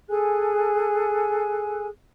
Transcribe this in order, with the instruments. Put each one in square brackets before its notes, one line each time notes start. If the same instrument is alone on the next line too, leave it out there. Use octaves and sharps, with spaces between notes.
[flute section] G#4 A4 G#5 F#6